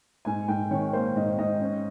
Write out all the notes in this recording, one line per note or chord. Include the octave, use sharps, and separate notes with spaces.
G#2 G#5
G#2 G5
D#3 C#5
A#3 C5
G#2 D#5
G#2 D#5
C#4